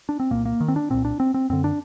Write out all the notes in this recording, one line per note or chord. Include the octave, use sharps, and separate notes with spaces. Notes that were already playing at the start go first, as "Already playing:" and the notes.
D4
C4
C2 A#2 A#3
A#3
D#3
C4
D4
C2 A#2 C4
D4
C4
C4
F#2 D3 C4
D4